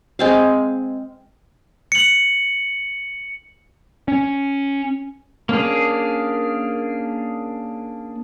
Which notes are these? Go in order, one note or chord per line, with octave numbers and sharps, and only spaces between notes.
G#3 C4 F5
C#7 F#7
C#4
A#3 C#4 D4 G#4